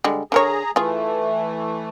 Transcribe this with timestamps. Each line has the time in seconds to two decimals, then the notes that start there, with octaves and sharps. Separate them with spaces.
0.04 D3 G3 G#3
0.32 D3 G#4 A#4 C#5 A#5
0.76 E3 A3 F4 G#4